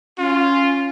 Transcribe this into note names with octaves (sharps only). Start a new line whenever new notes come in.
C#4 F4